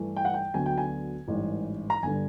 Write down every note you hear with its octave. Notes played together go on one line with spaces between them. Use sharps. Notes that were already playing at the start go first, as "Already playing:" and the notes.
Already playing: G2 E3 A3
G5
F#5
G5
D2 D3 F#3 B3 G#5
G5
G#5
A1 G#2 E3 G3
A#5
G1 G2 D3 G3 G#5